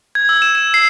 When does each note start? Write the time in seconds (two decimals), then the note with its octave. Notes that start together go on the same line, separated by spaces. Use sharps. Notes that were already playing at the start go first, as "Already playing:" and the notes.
0.15 G#6
0.29 E6
0.42 E7
0.55 E7
0.74 C7